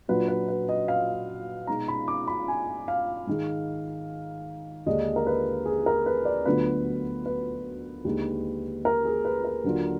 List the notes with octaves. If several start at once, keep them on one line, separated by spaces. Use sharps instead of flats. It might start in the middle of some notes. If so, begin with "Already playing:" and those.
A#2 F#3 D4 F4 B4
B4
B4
D#5
F5
B2 G#3 D#4 A#5
B5
D6
B5
G#5
F5
G#2 D#3 G#3
D#2 D3 G#3 D4 D#5
A#4
B4
G#4
A#4
B4
D5
D2 D3 F#3 B3 F4 B4
B4
D#2 D3 G#3 D#4
A#4
G#4
B4
A#4
D#2 D3 F#3 D4 F4